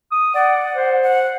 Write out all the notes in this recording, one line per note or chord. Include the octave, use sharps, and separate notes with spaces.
D#6
D5 F#5
C5
F#5